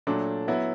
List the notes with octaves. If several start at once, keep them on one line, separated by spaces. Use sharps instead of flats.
A#2 F#3 A3 D4
F#3 B3 E4